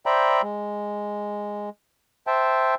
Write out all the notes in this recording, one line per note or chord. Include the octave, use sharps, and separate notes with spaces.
C5 D5 E5 G5 A#5 B5
G#3
C5 E5 G5 A5